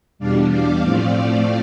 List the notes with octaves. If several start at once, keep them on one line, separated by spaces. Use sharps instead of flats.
E2 B2 G3 D4 D5 F5
D5 F5
A2 F3 A3 C4